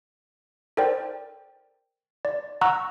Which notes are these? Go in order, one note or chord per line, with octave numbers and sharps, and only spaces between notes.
A4 A#4 C5 D5 G5
D5
F#5 A#5 C#6 E6 F#6